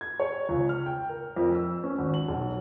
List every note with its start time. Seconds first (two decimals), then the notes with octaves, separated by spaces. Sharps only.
0.01 G#6
0.20 C#5
0.49 C#2
0.69 F6
0.86 G5
1.09 A#4
1.36 F2
1.55 E6
1.83 C#4
1.98 G#1
2.14 F#7
2.28 B1